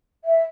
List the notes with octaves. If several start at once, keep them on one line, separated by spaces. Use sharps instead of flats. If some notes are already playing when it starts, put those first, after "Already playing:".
E5